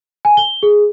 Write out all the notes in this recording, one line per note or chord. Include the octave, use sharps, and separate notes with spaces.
G#5
G7
G#4